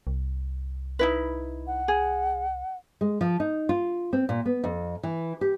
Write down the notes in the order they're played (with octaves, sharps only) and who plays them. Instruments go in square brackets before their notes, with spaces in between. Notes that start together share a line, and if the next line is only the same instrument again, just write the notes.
[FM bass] C2
[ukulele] D#4 E4 B4
[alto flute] F#5
[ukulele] G#4
[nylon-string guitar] G#3
F3
D#4
F4
C4
A#2
B3
F2
E3
G4